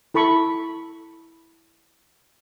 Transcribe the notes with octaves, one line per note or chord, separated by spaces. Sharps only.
E4 A4 B5 C#6